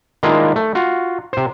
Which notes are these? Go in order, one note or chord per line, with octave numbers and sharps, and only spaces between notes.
D#3 G#3 A#3 D4 E4 F4
A3
F4 F#4
C3 C5